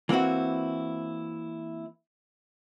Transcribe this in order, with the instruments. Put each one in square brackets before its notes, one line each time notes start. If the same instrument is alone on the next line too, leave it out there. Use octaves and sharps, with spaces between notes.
[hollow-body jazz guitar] E3 A#3 C4 E4 F#4